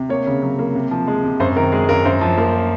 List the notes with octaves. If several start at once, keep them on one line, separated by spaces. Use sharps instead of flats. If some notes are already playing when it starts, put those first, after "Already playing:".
Already playing: C3
A#3 C#5
C#3
F#3
A#3
C3
F3
G#3
C3
F#2 C5
D#3 A#4
G#3 G#4
F#2 A#4
F#2 C5
F3
A#3